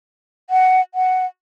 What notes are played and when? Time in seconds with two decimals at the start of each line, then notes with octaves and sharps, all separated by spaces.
0.50 F#5
0.95 F#5